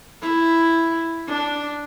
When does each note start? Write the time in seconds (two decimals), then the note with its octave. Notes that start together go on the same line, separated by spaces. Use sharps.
0.22 E4
1.27 D4